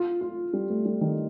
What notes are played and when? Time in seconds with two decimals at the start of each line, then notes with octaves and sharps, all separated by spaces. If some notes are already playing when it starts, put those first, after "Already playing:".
Already playing: F4
0.21 F4
0.53 G3
0.69 A3
0.85 G3
1.01 D#3